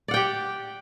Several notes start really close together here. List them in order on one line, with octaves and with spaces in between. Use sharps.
D5 F#5 G5 G4